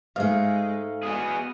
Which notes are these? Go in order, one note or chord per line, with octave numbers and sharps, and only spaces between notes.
G#2 G#3 A3 F5
B3 F#4 G#4 D#5